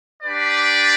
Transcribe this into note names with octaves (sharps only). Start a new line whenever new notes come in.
D4 G4 B4 D5